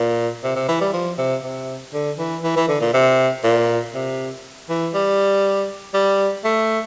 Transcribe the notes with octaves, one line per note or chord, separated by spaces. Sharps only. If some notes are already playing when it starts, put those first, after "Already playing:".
Already playing: A#2
C3
C3
E3
G3
F3
C3
C3
D3
E3
E3
E3
D3
A#2
C3
A#2
C3
E3
G3
G3
A3